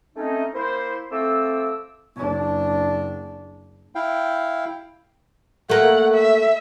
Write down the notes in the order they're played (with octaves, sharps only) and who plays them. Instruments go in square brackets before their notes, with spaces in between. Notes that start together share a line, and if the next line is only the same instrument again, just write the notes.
[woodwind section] A3 C4 C#4 D#4
A#3 E4 C5
F3 A3 C4 D6 E6
[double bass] F#1 D4
[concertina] E4 F5 G5
[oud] A3 A#3 [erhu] F#5
[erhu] E5